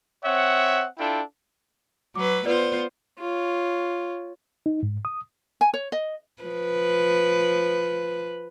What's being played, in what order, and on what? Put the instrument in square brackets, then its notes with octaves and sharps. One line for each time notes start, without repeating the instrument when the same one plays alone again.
[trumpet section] C4 C#5 E5 F#5
D4 E4 F4 A4 G5
[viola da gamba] F#3 B4 [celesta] D6
[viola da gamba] B3 F4 C5 [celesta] B4 D5
[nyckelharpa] F4 C#5
[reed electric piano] D#4
G#2
D#6
[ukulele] G#5
C#5
D#5
[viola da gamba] F3 B4